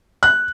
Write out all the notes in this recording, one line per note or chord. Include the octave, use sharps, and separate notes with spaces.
F#6